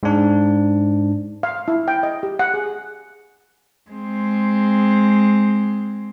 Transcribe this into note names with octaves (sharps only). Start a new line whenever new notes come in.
G#2 D4
F5
E4
G5
D#5
G4
F#5
G#4
G#3 C4